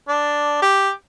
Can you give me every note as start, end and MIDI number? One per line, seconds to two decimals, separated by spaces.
0.08 0.59 62
0.62 0.90 67